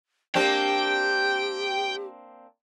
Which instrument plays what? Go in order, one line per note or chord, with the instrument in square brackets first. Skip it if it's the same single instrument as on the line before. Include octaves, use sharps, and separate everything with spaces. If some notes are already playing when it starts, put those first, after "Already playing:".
[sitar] A#3 C4 D4 [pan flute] G4 [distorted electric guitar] G5